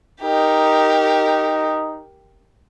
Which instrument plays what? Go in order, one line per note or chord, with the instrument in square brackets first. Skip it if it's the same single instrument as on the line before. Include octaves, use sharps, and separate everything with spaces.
[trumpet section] D#4 [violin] G4 A#4